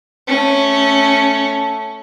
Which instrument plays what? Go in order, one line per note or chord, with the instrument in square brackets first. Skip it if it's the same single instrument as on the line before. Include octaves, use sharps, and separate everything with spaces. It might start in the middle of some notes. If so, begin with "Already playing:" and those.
[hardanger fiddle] A3 C#4